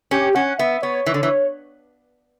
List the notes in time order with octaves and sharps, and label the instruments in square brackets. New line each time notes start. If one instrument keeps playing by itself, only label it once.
[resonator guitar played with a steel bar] C#4 [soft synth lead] G4
[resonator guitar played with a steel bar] C#4 [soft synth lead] F#5
[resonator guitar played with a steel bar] B3 [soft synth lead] E5
[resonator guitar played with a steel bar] B3 [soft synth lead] C#5
[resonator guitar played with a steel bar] E3
D3
E3